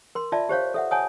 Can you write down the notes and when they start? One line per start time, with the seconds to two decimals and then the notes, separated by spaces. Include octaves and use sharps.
0.15 A#4 C6
0.32 F4 D5 E5 A5
0.49 G4 C5 C#5 F5
0.74 A4 E5 F#5
0.91 C#5 F#5 G#5 A5 D#6